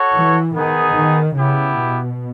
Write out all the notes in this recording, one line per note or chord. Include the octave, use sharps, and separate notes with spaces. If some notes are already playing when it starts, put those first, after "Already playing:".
Already playing: F#4 A4 C#5
E3
D#3 B3 D#4 G#4
D#3
C#3 B3 E4 G4
B2